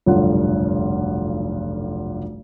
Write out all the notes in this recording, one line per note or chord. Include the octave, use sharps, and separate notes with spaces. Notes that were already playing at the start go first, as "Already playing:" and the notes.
F1 B1 G2 D3 F4 F#5